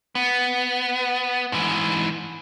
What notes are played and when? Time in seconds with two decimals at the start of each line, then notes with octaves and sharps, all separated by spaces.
0.15 B3
1.52 G#2 E3